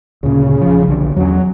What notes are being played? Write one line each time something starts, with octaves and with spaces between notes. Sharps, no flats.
D2 A#2 C#3
E1 F3
B1 D3 D4
E2 F#3 C#4